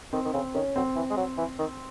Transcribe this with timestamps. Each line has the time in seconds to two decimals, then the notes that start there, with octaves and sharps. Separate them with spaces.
0.13 D#3 C4
0.25 D#3
0.34 C#3 C4
0.55 D#3 C#4
0.76 F#3 C4
0.96 E3
1.11 G#3
1.17 F#3
1.38 E3
1.59 D#3